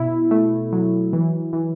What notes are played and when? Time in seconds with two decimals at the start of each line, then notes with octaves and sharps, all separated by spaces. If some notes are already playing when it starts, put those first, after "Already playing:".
Already playing: B2 E4
0.31 A3
0.73 F#3
1.13 E3
1.53 E3